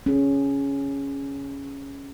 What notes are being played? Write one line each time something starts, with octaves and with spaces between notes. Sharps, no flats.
C#4 G#4